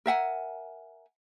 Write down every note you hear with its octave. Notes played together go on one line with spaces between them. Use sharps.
A#4 E5 F#5 G#5